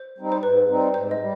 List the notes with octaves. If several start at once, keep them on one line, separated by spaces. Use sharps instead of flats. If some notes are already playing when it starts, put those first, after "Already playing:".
Already playing: C5
G3 C4 D#4
C5
G#2 B4
G3 C4 D#4
G#2 C5
D#5
G3